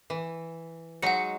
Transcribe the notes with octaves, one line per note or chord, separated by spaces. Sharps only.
E3
F#3 G#3 D#4 F#5 C#7